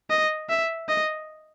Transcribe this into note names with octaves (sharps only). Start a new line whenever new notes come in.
D#5
E5
D#5